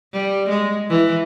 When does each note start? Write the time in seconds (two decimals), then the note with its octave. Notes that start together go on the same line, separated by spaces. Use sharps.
0.13 G3
0.49 G#3
0.89 E3